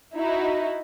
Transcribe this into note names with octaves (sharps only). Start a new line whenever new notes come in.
D#4 E4 F#4